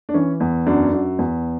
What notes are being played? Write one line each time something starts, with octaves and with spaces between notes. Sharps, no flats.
D4
E3 C#4
E2
F#2 D4
F#2
E2